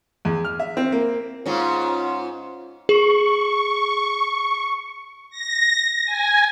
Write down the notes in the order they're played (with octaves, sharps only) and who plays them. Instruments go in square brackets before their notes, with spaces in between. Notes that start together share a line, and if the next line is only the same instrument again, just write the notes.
[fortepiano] E2
F6
E5
C4
A#3
[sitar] G#2 C#4 [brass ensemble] F4
[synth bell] G#4 [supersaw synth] C#6
[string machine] A#6
G#5